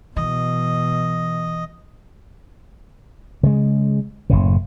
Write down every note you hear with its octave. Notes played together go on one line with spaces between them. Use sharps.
B2 E3 D#5
C#3 G#3
F#1 A2 C#3